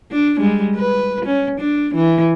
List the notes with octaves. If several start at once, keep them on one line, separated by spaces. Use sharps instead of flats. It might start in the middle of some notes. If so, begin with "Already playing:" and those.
D4
G3 G#3
B4
C#4
D4
E3